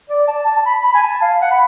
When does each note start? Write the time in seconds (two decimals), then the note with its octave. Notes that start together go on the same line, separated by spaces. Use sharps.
0.10 D5
0.28 A5
0.46 A5
0.57 A5
0.66 B5
0.84 B5
0.94 G#5
1.03 A5
1.22 F5
1.42 F#5
1.51 B5